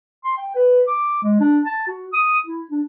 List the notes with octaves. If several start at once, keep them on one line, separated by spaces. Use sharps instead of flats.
C6
G5
B4
D6
G#3
D4
A5
F#4
D#6
E4
D4